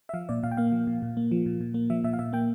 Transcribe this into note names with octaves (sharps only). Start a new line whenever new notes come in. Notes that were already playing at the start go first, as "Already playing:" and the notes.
E5
F3 F5
A#2 D5
A#2 F5
G5
A#3 F5
F3
A#2
A#2
A#3
F3
A#2
A#2
A#3
F3 E5
A#2 E5
F5
A#2 E5
A#3 G5